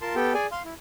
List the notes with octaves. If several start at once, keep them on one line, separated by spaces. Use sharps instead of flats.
F4 A#4 A5 C6
B3 G4 A4 G5
G#4 D5 G#5
F5 C6
E4